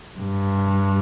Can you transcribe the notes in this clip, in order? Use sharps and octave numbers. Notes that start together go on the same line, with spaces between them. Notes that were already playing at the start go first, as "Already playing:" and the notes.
G2